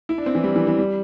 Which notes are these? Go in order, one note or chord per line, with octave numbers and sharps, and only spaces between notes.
E4
D4
C4
E3
G3
E3
E3
G3